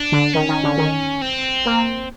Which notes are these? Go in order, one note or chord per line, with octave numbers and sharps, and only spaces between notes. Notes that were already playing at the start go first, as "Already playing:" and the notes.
Already playing: D4
D3
D#3 C#4
D#3
D3
D#3
C4
A#3